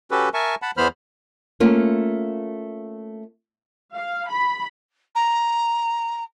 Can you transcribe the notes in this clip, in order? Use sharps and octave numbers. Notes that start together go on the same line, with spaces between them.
C#4 F#4 G4 A4 B4
A#4 E5 G#5 A5 C#6
F#5 A5 B5
E2 E3 B3 C5 B5 F6
A3 A#3 C#4 F4
F5
B5
A#5